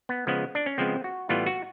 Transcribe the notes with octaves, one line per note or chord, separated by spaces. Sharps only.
B3
C#3 F3 G#3 B3
D4
C#4
C#3 F3 G#3 B3 C4
F#4
A2 E3 G3 B3 F4
F#4